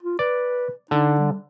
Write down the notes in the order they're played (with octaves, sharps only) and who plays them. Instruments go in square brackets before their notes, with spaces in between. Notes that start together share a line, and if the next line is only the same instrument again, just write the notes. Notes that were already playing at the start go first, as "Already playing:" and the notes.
[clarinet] F4
[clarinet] B4 [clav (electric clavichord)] D5
[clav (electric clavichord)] D3 [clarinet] D#4
[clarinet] G3